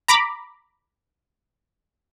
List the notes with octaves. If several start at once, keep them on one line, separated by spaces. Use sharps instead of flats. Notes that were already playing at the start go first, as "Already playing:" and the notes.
A#5 B5 D6